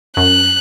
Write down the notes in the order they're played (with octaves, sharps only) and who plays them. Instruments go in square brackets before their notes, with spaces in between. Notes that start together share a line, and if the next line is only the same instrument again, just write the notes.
[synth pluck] F#2 [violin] F#6